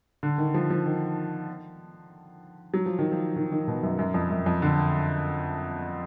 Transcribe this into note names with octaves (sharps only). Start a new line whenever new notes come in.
D3
D#3
F3
F3
D#3
F#3
F3
D#3
F3
D#3
D#3
B2
F#2
F#2
F2
F#2
F2
D3